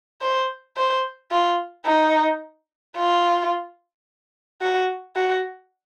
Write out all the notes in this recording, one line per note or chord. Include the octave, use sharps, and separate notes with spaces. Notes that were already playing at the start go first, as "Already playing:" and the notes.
C5
C5
F4
D#4
F4
F#4
F#4